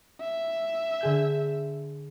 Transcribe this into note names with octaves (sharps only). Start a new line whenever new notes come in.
E5
D3 G#4 G6